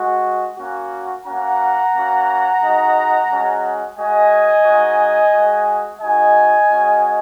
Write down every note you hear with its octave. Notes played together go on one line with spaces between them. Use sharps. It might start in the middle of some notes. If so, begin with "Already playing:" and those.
Already playing: G#3 F#4
A#3 C#4 F#4
A#3 C#4 F#4 F#5 A#5
A#3 C#4 F#4
G#3 D#4 F#4
G#3 C#4 F#4
G#3 F#4 D#5 G#5
G#3 D#4 F#4
G#3 F#4
G#3 D#4 F#4 D#5 G#5
G#3 C#4 F#4